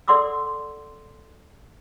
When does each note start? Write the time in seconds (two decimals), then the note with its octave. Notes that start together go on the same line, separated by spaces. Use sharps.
0.08 A4 D5 F#5 C6 D6 E6